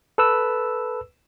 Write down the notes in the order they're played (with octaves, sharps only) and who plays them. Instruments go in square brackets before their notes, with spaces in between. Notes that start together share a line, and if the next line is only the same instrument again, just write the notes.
[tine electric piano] A4 B4 E6